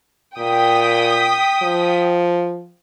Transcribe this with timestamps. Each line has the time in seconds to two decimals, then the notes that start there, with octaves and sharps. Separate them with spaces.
0.38 A#2 G5 D#6 B6
1.63 F3